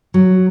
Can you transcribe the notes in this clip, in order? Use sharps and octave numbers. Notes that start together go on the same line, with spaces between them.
F#3